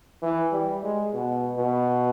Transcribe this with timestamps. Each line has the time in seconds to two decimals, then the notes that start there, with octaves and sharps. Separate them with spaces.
0.22 E3
0.52 G3
0.83 G#3
1.13 B2
1.58 B2